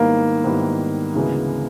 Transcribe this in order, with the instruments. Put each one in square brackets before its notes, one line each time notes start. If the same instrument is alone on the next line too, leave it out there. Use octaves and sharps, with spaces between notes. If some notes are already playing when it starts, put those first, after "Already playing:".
Already playing: [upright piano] G#2 D#3 G3 B3 E4 [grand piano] A#3
[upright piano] G#2 D#3 G3 B3 E4
D2 C#3 E3 G#3 B3